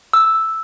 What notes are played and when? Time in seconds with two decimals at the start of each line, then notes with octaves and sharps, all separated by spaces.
0.13 E6